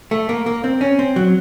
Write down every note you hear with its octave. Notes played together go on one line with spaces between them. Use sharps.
A3
A#3
A#3
C4
C#4
C4
F#3